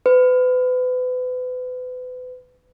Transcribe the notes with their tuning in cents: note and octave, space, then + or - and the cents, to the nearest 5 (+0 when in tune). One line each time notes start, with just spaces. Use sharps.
B4 +35